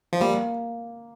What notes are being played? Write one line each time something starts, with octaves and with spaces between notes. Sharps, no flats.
F3
G3 A#3